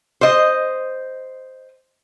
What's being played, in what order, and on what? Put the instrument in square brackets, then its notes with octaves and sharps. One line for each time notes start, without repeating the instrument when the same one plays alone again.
[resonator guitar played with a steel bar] C5 D#5